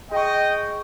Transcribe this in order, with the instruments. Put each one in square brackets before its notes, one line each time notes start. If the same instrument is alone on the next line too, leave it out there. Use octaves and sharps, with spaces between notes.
[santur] G#3 C#6 [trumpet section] D#5 G5